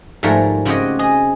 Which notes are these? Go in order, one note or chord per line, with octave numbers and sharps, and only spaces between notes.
G#2 F3 G3 A3 A#4 C#5
C#3 C4 F#4 G4 C#5 D#5
G#4 D#5